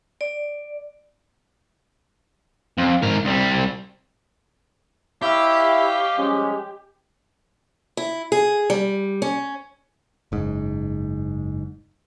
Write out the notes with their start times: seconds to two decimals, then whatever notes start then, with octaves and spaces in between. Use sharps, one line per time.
0.21 D5
2.78 F2
3.02 G#2 A#4
3.25 C2 G3
5.22 E4 G4 C#5 D#5 F5
6.17 F3 G3 G#3 C#4
7.97 E4
8.32 G#4
8.70 G3
9.22 C#4
10.32 F#1 G#2